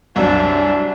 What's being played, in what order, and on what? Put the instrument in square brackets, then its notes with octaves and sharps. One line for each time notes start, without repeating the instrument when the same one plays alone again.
[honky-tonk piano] C2 F#2 [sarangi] D4